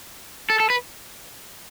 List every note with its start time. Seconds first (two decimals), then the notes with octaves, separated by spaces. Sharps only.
0.50 A4
0.60 A4
0.70 B4